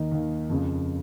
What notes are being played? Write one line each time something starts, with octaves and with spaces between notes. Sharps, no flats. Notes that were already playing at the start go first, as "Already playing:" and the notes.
Already playing: D#2 D#3 D#4
D#2 D#3
F2 C#3